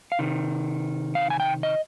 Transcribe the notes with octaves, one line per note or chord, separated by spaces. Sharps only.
F5
C3 D#3
F5
G#5
G5
D#5